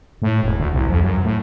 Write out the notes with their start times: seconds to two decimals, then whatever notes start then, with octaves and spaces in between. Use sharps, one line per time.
0.22 A2
0.43 E1
0.59 D2
0.73 C2
0.89 F2
1.02 F#2
1.24 A2